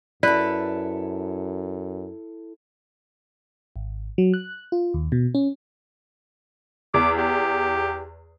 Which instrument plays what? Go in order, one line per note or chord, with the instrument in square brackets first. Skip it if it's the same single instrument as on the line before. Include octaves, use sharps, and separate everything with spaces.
[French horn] F#2 [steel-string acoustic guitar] E4 A4 [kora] B4 [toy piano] D5
[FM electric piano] G#1
F#3
F#6
F4
D#2
B2
C#4
[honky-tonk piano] E2 [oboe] D6
[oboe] G4